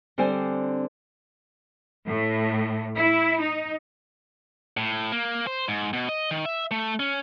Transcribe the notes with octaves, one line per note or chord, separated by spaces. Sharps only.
D3 G3 C4 C5 G#5
A2
E4
D#4
A2
A#3
C5
G#2
B2
D#5
D#3
E5
A3
C#4